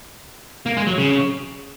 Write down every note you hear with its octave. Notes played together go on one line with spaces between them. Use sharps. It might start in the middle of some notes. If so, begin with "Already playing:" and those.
A#3
G#3
F#3
C#3